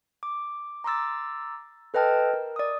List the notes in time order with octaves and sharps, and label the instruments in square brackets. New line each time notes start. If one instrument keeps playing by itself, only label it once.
[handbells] D6
A#5 C6 D6 E6 A6
A4 B4 D#5 G5 A5 F6
A#4
D5 D#6